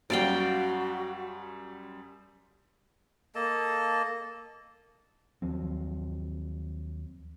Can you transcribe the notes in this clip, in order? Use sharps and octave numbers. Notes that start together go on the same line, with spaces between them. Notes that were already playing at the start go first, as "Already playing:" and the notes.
F#2 G3 F#4 D5 F5 G5
A#3 A4 D#5 A5
D#2 F3 F#3 C4